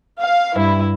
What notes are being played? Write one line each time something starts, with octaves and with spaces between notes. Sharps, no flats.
F5
G2 E4